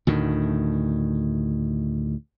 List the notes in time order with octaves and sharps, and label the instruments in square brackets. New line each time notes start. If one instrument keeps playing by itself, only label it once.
[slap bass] D2 A2 D#3